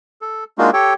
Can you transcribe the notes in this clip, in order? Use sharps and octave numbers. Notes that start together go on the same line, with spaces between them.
A4
G#3 A#3 D4 D#4 F4 F#4
G4 A4 C#5 G5